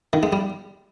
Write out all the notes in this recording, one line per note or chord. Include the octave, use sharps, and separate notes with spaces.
D#3
G#3
G3